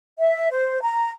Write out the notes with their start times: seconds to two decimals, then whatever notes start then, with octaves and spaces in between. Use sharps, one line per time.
0.18 E5
0.50 C5
0.81 A#5